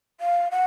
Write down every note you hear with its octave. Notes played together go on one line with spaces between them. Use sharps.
F5
F#5